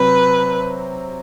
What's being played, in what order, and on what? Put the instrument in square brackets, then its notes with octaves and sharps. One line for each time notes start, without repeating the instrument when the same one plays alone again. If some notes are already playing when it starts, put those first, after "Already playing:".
Already playing: [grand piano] C3 F#3 C4 [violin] B4